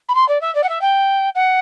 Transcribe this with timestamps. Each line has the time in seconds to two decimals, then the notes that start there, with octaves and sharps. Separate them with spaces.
0.09 B5
0.15 C6
0.28 D5
0.41 E5
0.55 D5
0.64 F#5
0.69 E5
0.81 G5
1.35 F#5